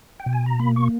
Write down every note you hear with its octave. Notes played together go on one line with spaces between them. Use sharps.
G5
B2
G#5
A#5
A#3 B5
C#6